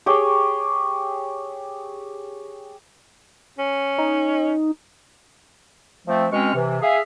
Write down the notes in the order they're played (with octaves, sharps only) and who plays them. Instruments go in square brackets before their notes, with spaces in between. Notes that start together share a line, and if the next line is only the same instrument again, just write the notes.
[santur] G4 G#4 C#5 G5
[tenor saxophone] C#4
[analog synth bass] D#4
[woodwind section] F3 A3 C4
B2 G#3 C4 C#4 C#6 F6
C3 E3
G#4 E5 F5